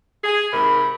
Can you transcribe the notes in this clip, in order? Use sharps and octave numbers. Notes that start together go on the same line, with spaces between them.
G#4
G#2 C3 A#4 B5